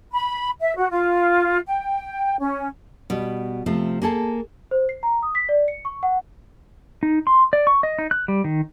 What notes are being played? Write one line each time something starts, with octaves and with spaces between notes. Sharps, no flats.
B5
E5
F#4
F4
G5
C#4
B2 G3
C3 F3 A3
A#3 G#4 A4 A5
C5
C7
A#5
D#6
B6
D5
C#7
C#6
F#5
D#4
C6
D5
C#6
D#5
D#4
F#6
G3
D#3